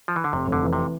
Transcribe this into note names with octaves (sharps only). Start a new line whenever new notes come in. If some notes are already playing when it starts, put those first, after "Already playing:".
F3
E3
D3
F1 C3
F1 D3
E3
C3